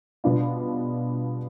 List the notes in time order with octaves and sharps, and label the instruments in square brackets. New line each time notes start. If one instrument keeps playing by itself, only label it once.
[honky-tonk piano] B2 G3 B3 D4 F4